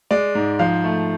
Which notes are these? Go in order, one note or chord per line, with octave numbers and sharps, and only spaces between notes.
G#3 D5
G#2
F3 F5
A3